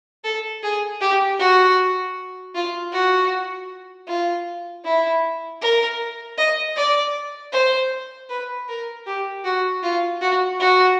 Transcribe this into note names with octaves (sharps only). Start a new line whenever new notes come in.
A4
G#4
G4
F#4
F4
F#4
F4
E4
A#4
D#5
D5
C5
B4
A#4
G4
F#4
F4
F#4
F#4